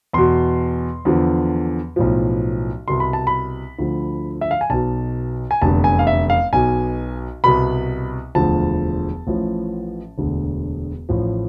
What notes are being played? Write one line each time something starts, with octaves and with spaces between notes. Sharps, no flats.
E2 B2 C6
E2 D3 F3
B1 A2 F3
C2 B2 C6
B5
A5
B5
D2 D3 F3
E5
F5
G#5
B1 B2 A5
G#5
F1 E2 D3 A5
G#5
F5
E5
F5
B1 B2 G#5
C2 B2 B5
E1 D2 D3 F3 A5
A1 A2 F3
E1 D2 D3
A1 A2 F3